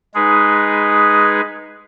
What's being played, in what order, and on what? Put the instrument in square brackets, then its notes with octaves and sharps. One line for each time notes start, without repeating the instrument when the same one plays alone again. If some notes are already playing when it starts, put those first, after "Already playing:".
[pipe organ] G#3 D#4 G#4 B4